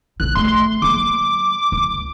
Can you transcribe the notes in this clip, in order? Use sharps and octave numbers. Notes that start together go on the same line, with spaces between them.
A#1 C#3 F#6
A3 C6
F#3 A#3 D6
C#2